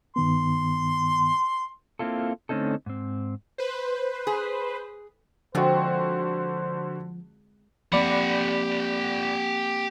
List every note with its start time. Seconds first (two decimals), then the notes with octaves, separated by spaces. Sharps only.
0.16 G2 D#3 B3 C6
1.99 A#3 C4 E4 F4 A4
2.49 D3 A3 C4 C#4 D#4 A4
2.86 G#2 C4
3.58 B4 C5
4.27 G#4
5.55 D3 F3 G#3 C4 F4 F#4 C5
7.92 F3 A#3 C4 G4 D5 F#5 B5